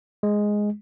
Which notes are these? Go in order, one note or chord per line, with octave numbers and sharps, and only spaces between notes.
G#3